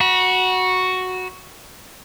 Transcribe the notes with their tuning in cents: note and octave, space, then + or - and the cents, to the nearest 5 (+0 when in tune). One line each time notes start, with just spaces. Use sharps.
F#4 +0 B5 -35